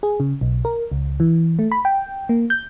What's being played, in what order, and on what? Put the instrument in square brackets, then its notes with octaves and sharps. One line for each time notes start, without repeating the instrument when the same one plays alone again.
[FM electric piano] G#4
C#3
B1
A#4
C#2
E3
A3
B5
G5
A#3
G6